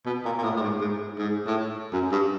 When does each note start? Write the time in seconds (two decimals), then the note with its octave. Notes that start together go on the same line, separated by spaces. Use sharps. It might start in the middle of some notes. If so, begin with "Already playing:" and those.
0.06 B2
0.25 A#2
0.38 A#2
0.43 A2
0.56 A2
0.62 G#2
0.80 G#2
1.18 G#2
1.46 A2
1.92 F#2
2.11 G2